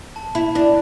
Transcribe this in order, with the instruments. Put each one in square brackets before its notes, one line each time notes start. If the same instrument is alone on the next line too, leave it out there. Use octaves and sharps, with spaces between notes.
[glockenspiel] A5
[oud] E4 [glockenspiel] B5
[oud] D4 [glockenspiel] A5